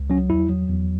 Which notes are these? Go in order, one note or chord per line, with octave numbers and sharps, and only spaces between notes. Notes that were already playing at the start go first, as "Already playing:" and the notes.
Already playing: C#2
F#3 C#4
E2 E4
F#3
E2